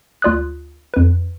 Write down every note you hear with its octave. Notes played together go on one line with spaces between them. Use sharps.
D2 F4 D5 D#6 F#6
F2 B4